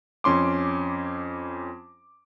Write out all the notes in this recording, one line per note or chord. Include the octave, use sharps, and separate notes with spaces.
F2 C#4 C6 D6